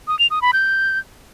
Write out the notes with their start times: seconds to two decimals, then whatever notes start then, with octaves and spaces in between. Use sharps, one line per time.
0.08 D#6
0.19 F7
0.30 D#6
0.42 B5
0.53 G6